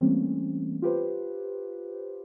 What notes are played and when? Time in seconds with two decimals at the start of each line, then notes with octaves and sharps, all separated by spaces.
0.01 E3 G3 A3 A#3 C4 C#4
0.82 F4 G4 B4 C5